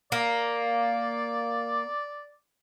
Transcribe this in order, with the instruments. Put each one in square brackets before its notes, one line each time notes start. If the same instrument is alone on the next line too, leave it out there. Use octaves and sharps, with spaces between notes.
[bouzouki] A#3 [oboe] D5